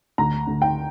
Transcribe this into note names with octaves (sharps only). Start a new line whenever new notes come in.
D2 A#5
D2
G5